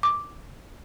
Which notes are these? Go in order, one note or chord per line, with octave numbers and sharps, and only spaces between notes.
D6